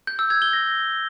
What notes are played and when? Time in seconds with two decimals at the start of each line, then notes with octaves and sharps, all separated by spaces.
0.07 G6
0.19 E6
0.30 G#6
0.42 G7
0.53 A#6